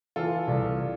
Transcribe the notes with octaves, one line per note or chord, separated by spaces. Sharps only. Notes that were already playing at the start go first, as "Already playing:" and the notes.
E3 F4 A4
C2